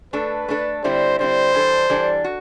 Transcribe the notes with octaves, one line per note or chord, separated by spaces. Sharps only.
A3 D4 A4 B4
A3 D4 A4
D3 G3 C4 E4 C5
D3 G3 C4 E4 C5
E3 G3 D4 A4
E3 G3 D4 A4
F#4